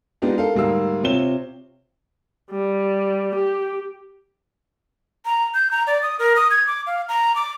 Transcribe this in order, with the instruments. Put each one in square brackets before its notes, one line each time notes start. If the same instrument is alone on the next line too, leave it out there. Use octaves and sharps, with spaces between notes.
[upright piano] G#3 B3 D4 D#4 F4 G4
A4 A#4 F5
D2 G#2 G3 A#3 F5 E6
C3 C4 F4 C#5 E7 G7
[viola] G3
G4
[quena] A#5
G6
A#5
D5
D#6
A#4
D#6
G#6
D6
F5
A#5
D6